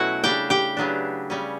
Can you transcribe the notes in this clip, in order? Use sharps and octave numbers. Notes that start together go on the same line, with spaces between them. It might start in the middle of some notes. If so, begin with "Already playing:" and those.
Already playing: B2 F#3 A3 C#4 E4 F#4 F#5
C#3 G3 D4 G4 G5
G4 G5
C#3 F#3 B3 D4
C#3 G3 C#4